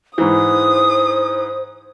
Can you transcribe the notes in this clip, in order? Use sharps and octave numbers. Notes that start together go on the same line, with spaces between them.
G#2 E3 C5 D#6